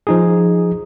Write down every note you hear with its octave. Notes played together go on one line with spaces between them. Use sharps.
F3 D#4 G#4